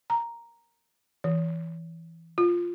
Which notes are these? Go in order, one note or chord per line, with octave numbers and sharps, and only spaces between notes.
A#5
E3
F4